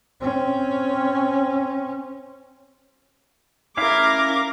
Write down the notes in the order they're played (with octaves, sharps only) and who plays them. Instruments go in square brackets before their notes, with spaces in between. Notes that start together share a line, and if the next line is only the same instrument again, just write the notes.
[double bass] C4 C#4
[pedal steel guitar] C#4 E4 F5 [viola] A#4 D6